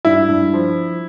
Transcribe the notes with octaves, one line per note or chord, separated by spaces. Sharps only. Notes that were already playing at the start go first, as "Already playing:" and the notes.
G2 E4
G2
F3